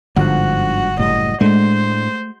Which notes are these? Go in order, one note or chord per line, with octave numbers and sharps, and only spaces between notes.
G1 G#2 D3 F3 F#4 F#5 F#6
F#1 A2 G3 D#5
A2 G#3 A3 D4 C5